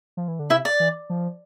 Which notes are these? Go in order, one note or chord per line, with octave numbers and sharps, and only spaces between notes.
F3
E3
D3
C3 E4 E5
D5
E3
F3